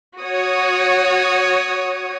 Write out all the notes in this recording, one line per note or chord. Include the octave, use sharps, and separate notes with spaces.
F#4 C#5 D#6